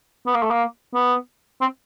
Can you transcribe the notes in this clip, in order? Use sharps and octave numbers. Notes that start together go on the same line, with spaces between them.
B3
A#3
A3
A#3
B3
C4